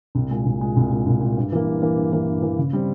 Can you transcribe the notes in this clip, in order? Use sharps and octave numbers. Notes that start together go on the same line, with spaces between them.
C2
A#2 G#3
C2
A#2 G#3
C2
A#2 G#3
C2
A#2 G#3
G2
E3 A#3
G2
E3 A#3
G2
E3 A#3
G2
E3 A#3
C#3
G3 C4